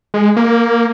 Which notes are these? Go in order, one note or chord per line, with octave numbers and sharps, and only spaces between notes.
G#3
A#3